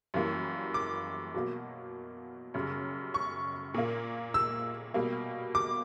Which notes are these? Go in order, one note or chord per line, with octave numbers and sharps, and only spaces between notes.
F#2 E3 G3 A#3
D6
B2 F#3 A#3
F#2 C#3 G3
C#6
A#2 A#3
E6
B2 G3 A#3
D6